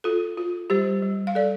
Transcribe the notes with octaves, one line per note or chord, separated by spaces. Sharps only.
F4 A4
F4
G3 G4 C5
G3
F5
G3 A4 D5